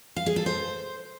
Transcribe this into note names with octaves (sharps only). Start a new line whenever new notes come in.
F5
G#4
A4
C5